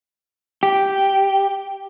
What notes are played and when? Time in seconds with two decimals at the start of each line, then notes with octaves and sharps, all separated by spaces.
0.63 G4